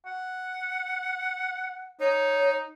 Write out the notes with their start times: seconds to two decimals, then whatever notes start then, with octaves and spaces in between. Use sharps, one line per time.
0.06 F#5
2.00 D#4 C#5